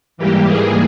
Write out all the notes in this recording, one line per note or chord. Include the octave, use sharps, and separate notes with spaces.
G#2 E3 G3 A#3 G4
G#4